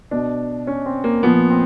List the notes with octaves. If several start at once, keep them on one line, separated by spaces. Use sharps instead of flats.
B2 D4
C#4
C4
A#3
A#2 F3 B3
C4